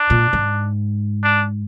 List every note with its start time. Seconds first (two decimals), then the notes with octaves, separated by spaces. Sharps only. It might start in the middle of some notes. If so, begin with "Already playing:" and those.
Already playing: D4
0.10 A#2
0.33 G#2
1.23 D4